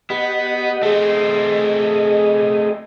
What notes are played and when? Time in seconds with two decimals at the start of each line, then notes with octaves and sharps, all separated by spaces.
0.10 B3 G4 D#5 F#5
0.83 A3 C4 G#4 D#5